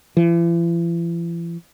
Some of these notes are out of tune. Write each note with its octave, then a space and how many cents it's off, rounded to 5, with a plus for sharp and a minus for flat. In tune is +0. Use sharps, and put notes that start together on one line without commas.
E3 +45